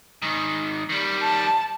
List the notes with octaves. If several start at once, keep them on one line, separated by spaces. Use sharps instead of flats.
G#2 D#3
D#3 G3
A5